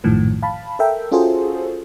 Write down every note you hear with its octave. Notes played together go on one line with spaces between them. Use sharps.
A#1 F#2 A2 D#3 F3
F5 A5 B5
A4 A#4 E5 G5
C#4 F4 F#4 G#4 A4 C5